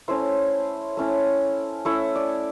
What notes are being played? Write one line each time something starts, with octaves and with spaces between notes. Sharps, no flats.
A3 C#4 E4 C5
A3 C#4 E4
A3 C#4 E4 C#5
D5